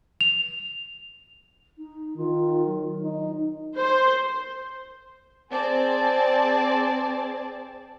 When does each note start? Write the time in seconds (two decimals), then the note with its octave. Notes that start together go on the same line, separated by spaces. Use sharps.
0.21 F7
1.77 D#4
2.17 D#3 F4
2.66 F#3
3.01 D#4
3.76 C5
5.51 C4 G#4 D5 A5